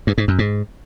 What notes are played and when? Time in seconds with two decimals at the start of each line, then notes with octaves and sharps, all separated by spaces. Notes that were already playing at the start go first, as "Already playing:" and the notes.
0.07 G2
0.18 G#2
0.28 F#2
0.39 G#2